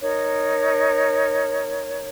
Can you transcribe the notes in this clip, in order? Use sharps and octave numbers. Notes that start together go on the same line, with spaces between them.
D#4 A#4 C#5